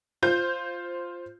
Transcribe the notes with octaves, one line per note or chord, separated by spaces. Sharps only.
F4 C5 G6